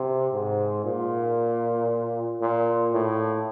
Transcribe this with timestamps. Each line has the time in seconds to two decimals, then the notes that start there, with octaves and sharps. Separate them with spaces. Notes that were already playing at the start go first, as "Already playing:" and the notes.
Already playing: C3
0.34 G#2
0.85 A#2
2.41 A#2
2.93 A2